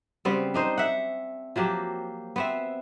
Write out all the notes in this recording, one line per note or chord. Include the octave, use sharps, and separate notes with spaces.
C#3 G3 B3 C4
D4 D#4 C5
E5 F#5
F3 F#3 A#3 G4
B3 C4 E5